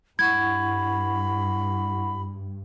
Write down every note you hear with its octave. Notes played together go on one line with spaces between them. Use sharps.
G2 E4 F#5 B5 C#6 G#6